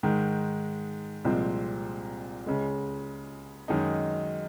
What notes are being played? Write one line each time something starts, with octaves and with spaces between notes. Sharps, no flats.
G#2 D#3 G#3
C2 A#2 F3 G#3 C4
C#2 C#3 G#3
F#2 D#3 G#3 D#4